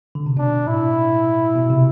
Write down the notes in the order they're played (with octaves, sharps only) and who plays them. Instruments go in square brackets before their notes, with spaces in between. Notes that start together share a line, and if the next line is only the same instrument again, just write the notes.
[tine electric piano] D3
C3
[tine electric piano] B2 [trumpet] D4
[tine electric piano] A2 [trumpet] E4
[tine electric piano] B2
C3